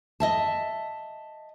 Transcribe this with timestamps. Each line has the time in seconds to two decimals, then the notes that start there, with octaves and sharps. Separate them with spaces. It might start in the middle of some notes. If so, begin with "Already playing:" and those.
0.20 D#5 E5 A5